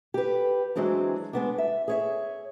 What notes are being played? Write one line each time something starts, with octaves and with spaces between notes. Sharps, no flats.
G4 B4
E3 F#3 G#3 C4 D4
G#3 B3 D4
E5
G#4 C#5 E5